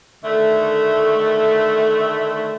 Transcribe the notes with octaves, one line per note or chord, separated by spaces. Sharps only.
D3 D#3 A3